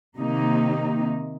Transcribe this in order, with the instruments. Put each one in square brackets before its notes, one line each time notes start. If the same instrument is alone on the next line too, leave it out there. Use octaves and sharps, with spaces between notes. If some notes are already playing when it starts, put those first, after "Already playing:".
[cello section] C3 D#3 A#3 D#4